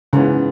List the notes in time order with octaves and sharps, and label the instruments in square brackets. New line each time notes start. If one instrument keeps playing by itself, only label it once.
[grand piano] G#2 E3 B3 [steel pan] C#3